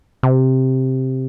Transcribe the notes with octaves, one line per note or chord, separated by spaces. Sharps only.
C3